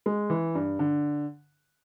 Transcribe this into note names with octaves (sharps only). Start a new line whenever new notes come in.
G#3
E3
G2
D3